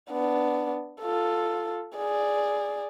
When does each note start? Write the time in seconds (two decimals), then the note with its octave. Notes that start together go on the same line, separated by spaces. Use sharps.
0.11 B3 D4
1.02 F4 A4
1.96 G#4 D5